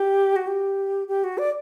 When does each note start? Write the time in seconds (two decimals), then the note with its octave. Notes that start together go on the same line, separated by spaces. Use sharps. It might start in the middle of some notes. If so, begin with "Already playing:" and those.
Already playing: G4
0.36 F#4
0.47 G4
1.08 G4
1.24 F#4
1.38 D5